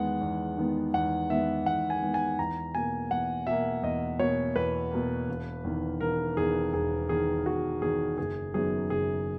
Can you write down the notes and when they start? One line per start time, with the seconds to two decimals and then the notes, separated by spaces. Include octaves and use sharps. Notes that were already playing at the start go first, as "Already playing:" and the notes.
Already playing: E2 D#3 G#3 B3 F#5
0.21 E2
0.58 D#3 G#3 B3
0.94 E2 F#5
1.30 D#3 G#3 B3 E5
1.66 E2 F#5
1.90 G#5
2.02 D#3 G#3 B3
2.14 G#5
2.39 E2 A#5
2.75 B2 A#3 G#5
3.11 E2 F#5
3.47 B2 A#3 E5
3.83 E2 D#5
4.19 B2 A#3 C#5
4.56 E2 B4
4.91 B2 A#3
5.29 E1
5.64 E2 D#3
6.01 E1 A#4
6.36 E2 D#3 G#4
6.74 E1 G#4
7.09 E2 D#3 G#4
7.46 E1 F#4
7.82 E2 D#3 G#4
8.18 F#1 G#4
8.54 F#2 D#3 F#3 B3 G#4
8.90 F#1 G#4